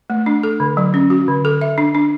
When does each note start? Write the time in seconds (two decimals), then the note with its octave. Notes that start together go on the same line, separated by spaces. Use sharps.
0.10 A3
0.26 D4
0.43 A4
0.60 D3
0.77 F#3
0.94 C#4
1.10 F#4
1.28 D3
1.45 A4
1.61 E5
1.78 D4
1.95 D4